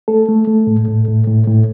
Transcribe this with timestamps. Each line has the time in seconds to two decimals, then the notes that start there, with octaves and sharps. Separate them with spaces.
0.08 A3 A4
0.28 A3
0.47 A3
0.67 A2
0.88 A2
1.08 A2
1.27 A2
1.47 A2